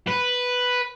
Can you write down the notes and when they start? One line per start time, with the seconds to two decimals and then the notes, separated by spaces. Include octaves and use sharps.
0.08 B4